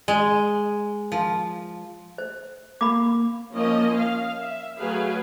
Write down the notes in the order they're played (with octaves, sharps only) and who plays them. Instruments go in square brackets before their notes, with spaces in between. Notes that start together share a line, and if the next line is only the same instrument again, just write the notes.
[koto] G#3
F3
[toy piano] C5
[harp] A#3 [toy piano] B5 D6
[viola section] F3 A#3 C#4 D#5
F5
E5
F#3 A3 G#4 B4 F5